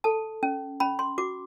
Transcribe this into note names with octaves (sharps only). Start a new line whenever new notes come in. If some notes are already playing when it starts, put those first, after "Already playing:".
A4 A5
C#4
C#4 B5
C6
F#4 D6